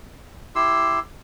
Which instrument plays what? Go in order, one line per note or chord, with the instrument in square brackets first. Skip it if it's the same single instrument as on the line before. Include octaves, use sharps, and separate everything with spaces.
[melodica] E4 G4 C6 E6